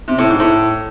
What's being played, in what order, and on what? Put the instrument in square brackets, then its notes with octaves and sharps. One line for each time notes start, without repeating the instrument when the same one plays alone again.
[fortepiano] C3
A2
G#2
A2